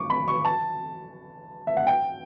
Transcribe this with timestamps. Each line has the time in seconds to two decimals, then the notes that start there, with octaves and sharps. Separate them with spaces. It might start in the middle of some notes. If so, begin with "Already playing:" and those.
Already playing: C#6 D6
0.10 B5
0.28 C#6
0.45 A5
1.67 E5
1.77 F#5
1.87 G5